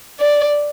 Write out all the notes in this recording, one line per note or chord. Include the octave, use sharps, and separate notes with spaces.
D5